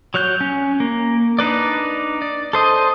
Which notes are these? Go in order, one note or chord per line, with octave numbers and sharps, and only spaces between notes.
F#3 C#5 F#6 G6
C#4
A#3
D4 D#4 B4 D5
D5
A4 C5 D#5